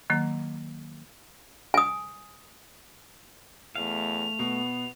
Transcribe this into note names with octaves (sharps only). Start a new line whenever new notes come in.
D#3 F#3 A#3
G#5 D#6
E2 A3 F5 F7
B2 B3